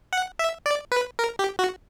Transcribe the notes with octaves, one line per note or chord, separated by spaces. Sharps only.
F#5
E5
D5
B4
A#4
G4
F#4